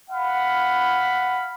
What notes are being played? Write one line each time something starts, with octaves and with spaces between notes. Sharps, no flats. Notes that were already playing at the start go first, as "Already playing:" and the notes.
F5 F#5 B5